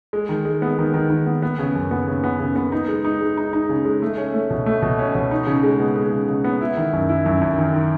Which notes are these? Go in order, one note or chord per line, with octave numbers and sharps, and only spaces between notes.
G#3
D#3
G#3
B3
D#3
D#3
D#3
B3
B3
C#3
F#2
B3
C#3
B3
C#3
B3
D#4
G#3
D#4
G#3
D#4
D#4
C#3
G#3
A3
C#4
A3
B2
A3
B2
C#4
B2
D#4
C#3
G#3
B3
G#3
C#3
C#3
B3
E4
D#3
F#2
E4
F#2
F#2
D#3
D#3